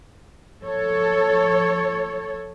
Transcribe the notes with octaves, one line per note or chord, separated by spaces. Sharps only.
F3 A4 C#5